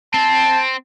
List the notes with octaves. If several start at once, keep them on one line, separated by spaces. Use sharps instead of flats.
C4 A5